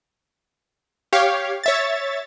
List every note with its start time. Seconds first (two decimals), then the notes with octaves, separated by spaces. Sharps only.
1.13 G4 C#5 F5
1.64 C#5 E5 A6